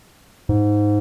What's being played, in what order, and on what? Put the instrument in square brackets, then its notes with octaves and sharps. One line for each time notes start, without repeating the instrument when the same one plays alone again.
[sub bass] G#2